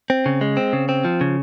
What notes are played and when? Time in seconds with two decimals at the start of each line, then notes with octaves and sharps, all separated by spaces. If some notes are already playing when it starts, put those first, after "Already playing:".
0.10 C4
0.26 C#3
0.41 G#3
0.57 C4
0.73 C#3
0.89 C4
1.05 F3
1.21 C#3